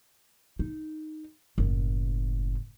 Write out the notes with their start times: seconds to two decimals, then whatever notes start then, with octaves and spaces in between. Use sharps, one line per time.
0.59 D#4
1.58 F#1 A2